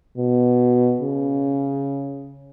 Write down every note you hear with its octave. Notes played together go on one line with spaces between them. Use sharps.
B2
C#3